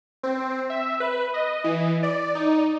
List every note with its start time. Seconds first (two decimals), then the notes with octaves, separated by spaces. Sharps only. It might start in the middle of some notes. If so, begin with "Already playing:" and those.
0.23 C4
0.70 E5
1.00 B4
1.34 D#5
1.64 E3
2.03 D5
2.35 D#4